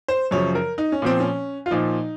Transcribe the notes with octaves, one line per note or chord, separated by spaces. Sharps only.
C5
F#2 C#3 F3 C#5
A#4
D#4
C#4
A#2 F3 C4
C#4
F4
A#2 F3 D#4